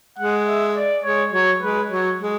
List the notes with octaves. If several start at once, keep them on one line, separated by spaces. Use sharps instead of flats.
G#3 F#5
E5
D5
G#3 C#5
F#3 C#5
G#3 B4
F#3 C#5
G#3